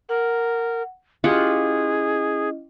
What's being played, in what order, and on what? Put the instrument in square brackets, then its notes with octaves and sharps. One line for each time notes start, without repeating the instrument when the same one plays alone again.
[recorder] A#4 [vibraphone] F#5
[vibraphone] C#4 E4 D#5 [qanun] F4 G4 F#5 [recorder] G#4